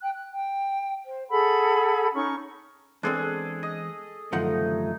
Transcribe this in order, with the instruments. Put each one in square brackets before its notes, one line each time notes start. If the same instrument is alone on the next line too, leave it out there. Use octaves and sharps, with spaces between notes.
[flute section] G5 F#6
F#6
G5
C5
G#4 A4 F#5 B5
C#4 D#4 C#6
[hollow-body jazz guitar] E2 G#3 C4 [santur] D4 G#4 A4
[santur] D#5
[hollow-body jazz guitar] C2 F3 F#5 [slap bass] F#2 D3 D#3 [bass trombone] A3 [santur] D#4